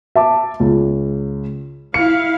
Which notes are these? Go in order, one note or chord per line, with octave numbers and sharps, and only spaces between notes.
E5 A5 D6
C#2
E4 F5 C#7